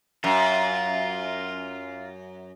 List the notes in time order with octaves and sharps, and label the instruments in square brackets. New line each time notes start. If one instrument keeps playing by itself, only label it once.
[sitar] F#2 [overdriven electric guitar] F4